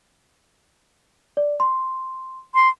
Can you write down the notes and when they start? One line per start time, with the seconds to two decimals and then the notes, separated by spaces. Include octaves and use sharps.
1.37 D5
1.60 C6
2.54 C6